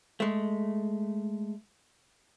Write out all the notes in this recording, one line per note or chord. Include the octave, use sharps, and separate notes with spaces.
G#3 A3